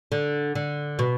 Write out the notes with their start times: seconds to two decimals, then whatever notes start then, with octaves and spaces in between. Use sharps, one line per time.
0.12 D3
0.55 D3
0.99 B2